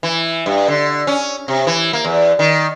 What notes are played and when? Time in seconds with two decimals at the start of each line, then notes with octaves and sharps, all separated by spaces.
0.03 E3
0.46 G2
0.68 D3
1.07 C#4
1.48 C3
1.67 E3
1.93 A#3
2.05 E2
2.39 D#3